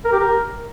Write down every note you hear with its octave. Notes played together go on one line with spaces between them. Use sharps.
A#4
G4
A#4